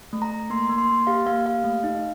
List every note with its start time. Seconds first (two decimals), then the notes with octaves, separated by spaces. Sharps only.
0.13 A3
0.22 A#5
0.31 A3
0.50 A#3 C6
0.69 A#3
0.78 C6
0.88 A#3
1.07 G4 F5
1.26 A#3 F5
1.46 G4 F5
1.64 A3
1.84 D#4